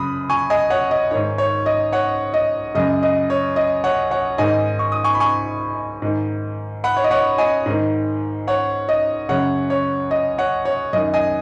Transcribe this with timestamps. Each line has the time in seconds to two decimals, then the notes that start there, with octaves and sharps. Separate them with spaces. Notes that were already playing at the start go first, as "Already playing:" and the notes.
Already playing: F#2 C#3 B5 D#6
0.30 G#5 C#6
0.50 D#5 G#5
0.70 C#5 F#5
0.91 D#5
1.11 G#2 D#3 C#5
1.38 C#5
1.66 D#5
1.93 C#5 F#5
2.34 D#5
2.75 F#2 C#3 D#5
3.03 D#5
3.30 C#5
3.56 D#5
3.84 C#5 F#5
4.11 C#5 F#5
4.38 G#2 D#3 D#5 G#5
4.79 C#6
4.92 D#6
5.04 G#5 C#6
5.14 B5
5.20 G#5 C#6
6.02 G#2 D#3
6.84 F#5 B5
6.97 C#5
7.04 D#5
7.11 C#5 F#5
7.38 D#5 G#5
7.66 G#2 D#3
8.47 C#5 F#5
8.89 D#5
9.29 F#2 C#3 C#5 F#5
9.70 C#5
10.11 D#5
10.38 C#5 F#5
10.65 C#5
10.93 F#2 D#5
10.97 D#3
11.14 D#5 G#5